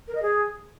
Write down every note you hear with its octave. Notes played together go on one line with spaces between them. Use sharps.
A#4
D#5
G#4